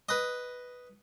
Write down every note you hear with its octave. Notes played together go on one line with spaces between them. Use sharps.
B4 D#5